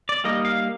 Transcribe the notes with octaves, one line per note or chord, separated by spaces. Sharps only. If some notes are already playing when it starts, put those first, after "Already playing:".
D5
G3 A#3 D#4 D#5
F5